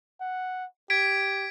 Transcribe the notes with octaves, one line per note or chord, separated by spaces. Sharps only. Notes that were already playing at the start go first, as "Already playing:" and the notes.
F#5
G4 G#6 B6 D7